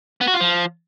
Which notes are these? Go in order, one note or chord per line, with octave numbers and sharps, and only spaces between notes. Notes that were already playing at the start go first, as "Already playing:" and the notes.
B3
F#4
F4
F3